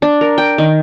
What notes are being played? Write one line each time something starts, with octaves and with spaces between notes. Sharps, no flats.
D4
A#4
G5
D#3